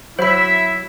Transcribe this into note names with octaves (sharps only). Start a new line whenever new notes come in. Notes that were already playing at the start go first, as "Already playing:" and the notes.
F#3 E4 C5 E5 B5